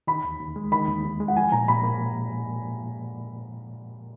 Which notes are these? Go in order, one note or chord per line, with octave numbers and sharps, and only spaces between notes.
D#3 B5
D#2
D#2
G#3
D#3 B5
D#2
D#2
G#3
F#5
F3 G#5
A#2 A#5
A#2 B5
A#3